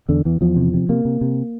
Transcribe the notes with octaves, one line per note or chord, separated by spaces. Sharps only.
E2 D3
E2 E3
E2 F3
C3
C3
C3 A#3
C3
C3